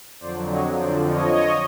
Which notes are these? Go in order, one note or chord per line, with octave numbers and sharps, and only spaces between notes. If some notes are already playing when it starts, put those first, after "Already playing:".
F2 D3 F#3 C5 D5
C#5 D#5
F2 D3 F3 C5 D5
C#5 D#5